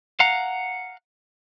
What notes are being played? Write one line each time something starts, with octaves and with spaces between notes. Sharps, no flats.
F5 F#5 A#5